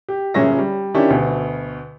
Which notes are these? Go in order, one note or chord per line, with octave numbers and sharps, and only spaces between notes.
G4
G1 A#2 C#4 G#4 E5 A#6
G3
D#3 C#4 D4 E4 G4
D2 B2